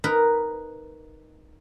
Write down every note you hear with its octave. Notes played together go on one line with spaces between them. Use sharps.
D#4 A#4 B4